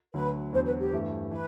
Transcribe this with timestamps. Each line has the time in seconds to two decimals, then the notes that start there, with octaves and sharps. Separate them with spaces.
0.14 D2 D3 F#3 B4
0.53 E2 D3 F#3 C5
0.66 B4
0.80 G4
0.93 G2 E3 A3
1.31 E3 B4